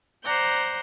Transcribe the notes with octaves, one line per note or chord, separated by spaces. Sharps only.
C5 D5 F#5 A#5 G6